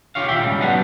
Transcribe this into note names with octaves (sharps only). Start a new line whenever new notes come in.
F4 G4 C#5 F5
D#2 A#2 E5 G5
G#2 C#3 G3
F#3 B3 D#4 G4 A4 F#5